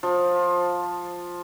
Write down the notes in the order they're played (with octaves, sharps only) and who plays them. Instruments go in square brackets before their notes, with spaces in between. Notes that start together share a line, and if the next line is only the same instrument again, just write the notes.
[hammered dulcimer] F3